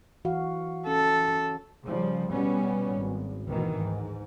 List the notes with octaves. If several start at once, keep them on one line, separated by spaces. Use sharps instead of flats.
E3 F#4 F5
C#4 A4
C#3 F3 G3
B2 G3 B3 C#4
G#1
D2 B2 D#3 E3
G#2